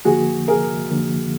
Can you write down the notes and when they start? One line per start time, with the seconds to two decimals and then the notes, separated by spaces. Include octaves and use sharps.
0.05 F2 D3 F3 A#3 F#4 G#4
0.48 G#4 A#4
0.90 F2 D3 F3 A#3